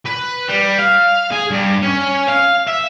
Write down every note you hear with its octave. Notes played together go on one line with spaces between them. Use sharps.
B4
G3
F5
G#4
G2
C#4
F5
E5